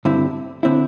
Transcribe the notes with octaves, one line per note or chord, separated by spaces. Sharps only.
G2 D3 C4 E4
D3 C4 E4